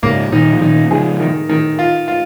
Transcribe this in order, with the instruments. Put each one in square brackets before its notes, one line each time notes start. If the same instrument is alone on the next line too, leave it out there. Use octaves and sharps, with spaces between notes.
[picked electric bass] G#2 C#3 [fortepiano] A#3
[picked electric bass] A#2 D#3 [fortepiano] D#4
[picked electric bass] F3
[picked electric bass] A#2 D#3 [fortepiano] D#4
[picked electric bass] C#3 F3 [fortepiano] G#4
[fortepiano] D#3
D#3
F4
F4